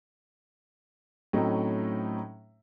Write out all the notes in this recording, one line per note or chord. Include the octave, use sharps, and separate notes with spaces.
A2 F#3 A3 C4 C#4 D#4